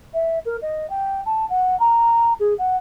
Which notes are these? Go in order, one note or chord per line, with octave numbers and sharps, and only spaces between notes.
E5
A#4
D#5
G5
A5
F#5
A#5
G#4
F#5